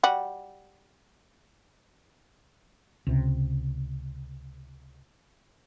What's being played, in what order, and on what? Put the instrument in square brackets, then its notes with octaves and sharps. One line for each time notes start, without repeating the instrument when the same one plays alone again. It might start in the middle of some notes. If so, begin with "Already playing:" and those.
[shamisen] G3 F#4
[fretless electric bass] C#2 C3